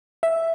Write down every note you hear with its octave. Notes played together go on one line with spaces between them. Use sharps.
E5